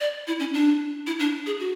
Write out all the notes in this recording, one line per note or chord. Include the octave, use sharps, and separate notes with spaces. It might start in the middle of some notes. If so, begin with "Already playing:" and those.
D5
E4
C#4
D4
E4
D4
G#4
F#4